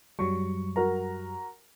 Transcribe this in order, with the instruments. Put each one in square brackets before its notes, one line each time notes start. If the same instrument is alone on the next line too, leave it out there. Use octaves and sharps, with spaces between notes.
[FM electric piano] F#2 F#3 G3 [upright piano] C#6
[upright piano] F#4 A#4 A#5